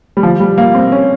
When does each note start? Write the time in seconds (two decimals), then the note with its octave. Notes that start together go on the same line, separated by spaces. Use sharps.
0.17 G3
0.23 F3
0.40 G3
0.58 A#3
0.75 C4
0.92 C#4